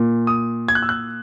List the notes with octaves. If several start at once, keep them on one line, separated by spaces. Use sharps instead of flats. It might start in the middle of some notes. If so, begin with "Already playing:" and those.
Already playing: A#2
D#6
G#6
F#6
E6
F#6